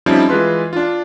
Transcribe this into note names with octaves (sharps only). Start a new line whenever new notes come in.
F3 G3 C4 C#4 D#4 E4
E3 G#3 F4 B4 C6
D4 F4